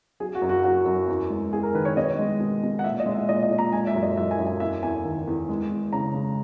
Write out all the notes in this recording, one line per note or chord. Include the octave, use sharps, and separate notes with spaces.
F#3 G#4
F#4
F#2
F#4
F#3 F#4
F#2
E2
G#3
E2 G#4
A#4
D#3 B4
C#5
B2 D#5
G#3
B2
B2
F#5
A#2 E5
D#5
G#3
E5
A#2 D#5
D#5
A#2
A#5
G#3 G#5
E5
F#2
D#5
F#2 E5
G#5
F#2
G#5
E2 E5
E2 G#5
D#3
E2
G#3
E2
C#3 A#5
G#3